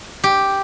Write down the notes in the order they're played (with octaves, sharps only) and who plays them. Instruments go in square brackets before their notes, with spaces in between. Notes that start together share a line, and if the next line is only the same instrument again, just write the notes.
[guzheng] G4